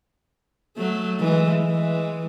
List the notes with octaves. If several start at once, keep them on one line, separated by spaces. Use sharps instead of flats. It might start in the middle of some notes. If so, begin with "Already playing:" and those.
F#3 A3
E3 G#3
E3 G#3